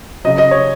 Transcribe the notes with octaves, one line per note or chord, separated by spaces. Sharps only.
C#3 F#3 D#5
D#5
C#5